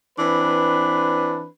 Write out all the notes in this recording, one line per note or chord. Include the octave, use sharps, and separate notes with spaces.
E3 C4 D4 B4